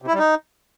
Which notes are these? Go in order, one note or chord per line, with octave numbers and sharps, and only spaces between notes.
C3
E4
G3
D#4